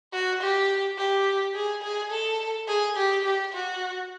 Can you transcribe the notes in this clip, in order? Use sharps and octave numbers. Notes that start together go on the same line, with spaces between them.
F#4
G4
G4
G#4
G#4
A4
G#4
G4
G4
F#4